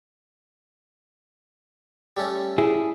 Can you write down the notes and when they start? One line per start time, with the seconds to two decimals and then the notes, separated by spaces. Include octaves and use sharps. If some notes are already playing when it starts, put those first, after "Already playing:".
2.17 G3 A3 C#4
2.58 E4 G#4